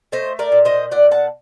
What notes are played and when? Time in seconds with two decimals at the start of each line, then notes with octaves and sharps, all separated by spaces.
0.12 A3 C5 D#5
0.39 A#4 D5
0.52 A#2
0.65 C5 D#5
0.91 A#2 D5 F#5
1.11 F#5 A5